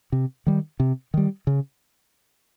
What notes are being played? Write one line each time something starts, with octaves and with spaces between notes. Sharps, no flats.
C3
D#3 G3
C3
D#3 G3
C#3